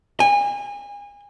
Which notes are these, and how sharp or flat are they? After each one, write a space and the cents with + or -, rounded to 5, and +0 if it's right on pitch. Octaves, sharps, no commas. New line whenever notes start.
G#5 -30